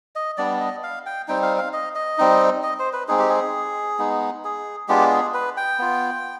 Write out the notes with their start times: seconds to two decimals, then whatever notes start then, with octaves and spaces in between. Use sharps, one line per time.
0.16 D#5
0.37 G3 B3 D4 D5
0.60 D#5
0.83 F5
1.06 G5
1.28 G3 C4 D#4 G5
1.43 F5
1.58 F5
1.73 D#5
1.95 D#5
2.18 G3 C4 D#4
2.63 D#5
2.79 C5
2.93 B4
3.08 G#3 C4 D#4 G#4
3.19 G4
3.29 G#4
3.99 G#3 B3 D#4
4.44 G#4
4.88 G#3 B3 D4 F4 G4
5.11 G#4
5.34 B4
5.57 G5
5.79 B3 F4